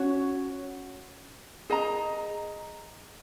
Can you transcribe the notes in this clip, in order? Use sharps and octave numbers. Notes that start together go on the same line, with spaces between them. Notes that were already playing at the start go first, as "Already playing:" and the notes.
Already playing: C#4 F#4 C#5
G#4 D#5 A#5